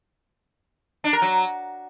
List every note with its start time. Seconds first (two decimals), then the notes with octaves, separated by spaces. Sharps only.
1.04 D4
1.13 A#4
1.22 F#3